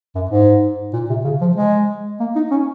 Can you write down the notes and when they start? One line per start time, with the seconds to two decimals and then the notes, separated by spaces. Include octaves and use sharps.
0.15 F#2
0.31 G#2
0.93 A#2
1.10 C3
1.25 C#3
1.41 F3
1.56 G#3
2.20 A#3
2.36 D#4
2.51 C#4